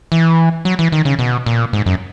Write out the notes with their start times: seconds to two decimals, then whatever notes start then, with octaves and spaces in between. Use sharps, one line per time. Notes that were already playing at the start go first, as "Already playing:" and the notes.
0.12 E3
0.65 F#3
0.79 E3
0.92 D#3
1.05 C#3
1.19 B2
1.46 A#2
1.73 G#2
1.86 F#2